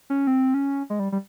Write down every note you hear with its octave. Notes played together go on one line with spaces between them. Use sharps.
C#4
C4
C#4
G#3
G3
G3